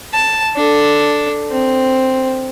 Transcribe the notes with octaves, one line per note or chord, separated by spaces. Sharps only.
A5
D4 A4
C4